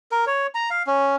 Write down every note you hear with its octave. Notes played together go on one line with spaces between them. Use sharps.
A#4
C#5
A#5
F5
C#4